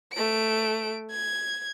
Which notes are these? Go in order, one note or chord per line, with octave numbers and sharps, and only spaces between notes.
A3 D7
G#6